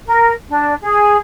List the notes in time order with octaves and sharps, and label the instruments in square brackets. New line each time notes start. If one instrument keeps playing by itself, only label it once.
[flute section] A#4
D4
G#4